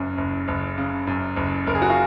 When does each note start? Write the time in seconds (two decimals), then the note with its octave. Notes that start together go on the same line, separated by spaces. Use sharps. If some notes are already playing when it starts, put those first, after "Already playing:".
Already playing: F#1 F#2 C#3
0.18 F#1
0.48 F#1
0.78 C#3
1.07 F#2
1.36 F#1
1.67 F#1 A#4
1.75 G#4
1.82 F#4
1.90 F4